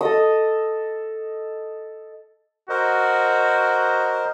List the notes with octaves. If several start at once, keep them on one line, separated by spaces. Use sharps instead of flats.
A4 D#5 D#6
F#4 A#4 C5 D#5